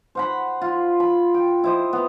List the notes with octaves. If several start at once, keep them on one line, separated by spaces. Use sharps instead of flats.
C5 F#5 B5
F4
B5
G5
E4 C5 D#5
B3